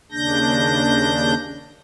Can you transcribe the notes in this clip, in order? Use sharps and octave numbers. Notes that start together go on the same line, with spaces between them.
D#2 C#3 D4 G6 A#6